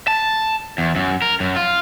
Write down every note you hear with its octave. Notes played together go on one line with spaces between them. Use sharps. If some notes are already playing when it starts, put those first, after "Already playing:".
A5
E2
F#2
A#4
F#2
F4